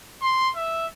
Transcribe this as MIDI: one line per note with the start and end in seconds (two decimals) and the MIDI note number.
0.22 0.49 84
0.56 0.86 76